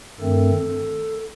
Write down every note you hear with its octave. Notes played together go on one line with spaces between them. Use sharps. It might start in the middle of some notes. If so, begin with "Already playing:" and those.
G2 D#3 A3 C4 A4